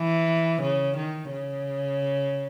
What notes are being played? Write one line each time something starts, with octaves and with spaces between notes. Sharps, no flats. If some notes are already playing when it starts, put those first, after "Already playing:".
Already playing: E3
C#3
D#3
C#3